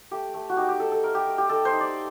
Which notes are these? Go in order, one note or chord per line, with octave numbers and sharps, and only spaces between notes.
A3 G4
A3
F#4
D#4 G4
G4
D#4 A4
A4
A3 A#4
G4
A3
G4
D#4 A4
C5
D#4
D5